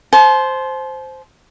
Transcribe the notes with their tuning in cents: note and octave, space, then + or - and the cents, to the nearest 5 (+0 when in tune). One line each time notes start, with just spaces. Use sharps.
C5 +0 A5 -40